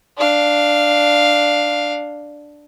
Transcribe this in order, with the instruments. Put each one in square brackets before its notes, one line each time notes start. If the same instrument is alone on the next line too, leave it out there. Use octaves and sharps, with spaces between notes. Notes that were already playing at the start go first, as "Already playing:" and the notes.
[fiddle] D4 F5